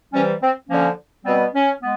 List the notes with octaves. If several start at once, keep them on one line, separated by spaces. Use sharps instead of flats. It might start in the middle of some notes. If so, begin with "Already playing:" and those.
C3 E3 G3 C#4
C4
D3 F3 A#3 C#4
B2 G3 B3 C4
C#4
G#3 B3